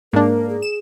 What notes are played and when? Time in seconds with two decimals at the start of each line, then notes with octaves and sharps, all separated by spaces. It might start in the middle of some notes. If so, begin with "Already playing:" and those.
0.13 G#2 A#3 D4 A#4
0.49 G#4
0.62 E7